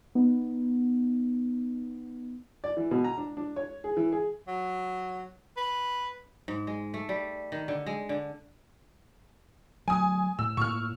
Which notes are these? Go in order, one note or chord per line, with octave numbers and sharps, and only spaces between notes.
B3 D#4
D5
E3
B2
A#5
D4
D4
C#5
G#4
E3
G#4
F#3
B4
G#2
G#3
A3
G3
D#3
D3
G#3
D3
F#3 A3 G#5 D#6
A2 E6
A2 A#3 C#6 F6